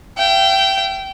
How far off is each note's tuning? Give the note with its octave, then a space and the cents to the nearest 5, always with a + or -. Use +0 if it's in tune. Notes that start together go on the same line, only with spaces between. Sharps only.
E5 +45 G5 -20